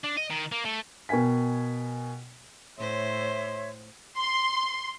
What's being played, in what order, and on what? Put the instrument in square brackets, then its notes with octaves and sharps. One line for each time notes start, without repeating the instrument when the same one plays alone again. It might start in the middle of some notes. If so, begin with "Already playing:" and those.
[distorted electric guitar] D4
D#5
D#3
A#3
A3
[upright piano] B2 A#4 G5 G#5 B6
[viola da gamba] A2 C5 [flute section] C#5 E5 C6
[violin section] C6